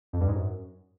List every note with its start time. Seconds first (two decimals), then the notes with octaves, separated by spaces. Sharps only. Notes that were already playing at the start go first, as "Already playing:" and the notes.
0.13 F2
0.20 G2
0.28 G#2
0.35 F#2